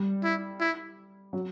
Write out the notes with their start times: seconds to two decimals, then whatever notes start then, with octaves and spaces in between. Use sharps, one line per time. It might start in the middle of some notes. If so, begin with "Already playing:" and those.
Already playing: G3
0.23 E4
0.60 E4
1.33 F#3